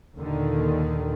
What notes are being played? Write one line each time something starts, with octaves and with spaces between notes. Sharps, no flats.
D#2 A#2 D3 D#3